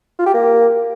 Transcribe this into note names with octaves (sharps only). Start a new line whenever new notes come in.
F4
G4
A#3